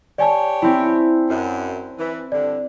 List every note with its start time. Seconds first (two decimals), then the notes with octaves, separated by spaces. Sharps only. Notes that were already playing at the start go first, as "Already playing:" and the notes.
0.18 G4 C#5 D5 G#5 A5
0.62 C4 E4
1.29 F#2
1.98 E3
2.32 G2 D3 D5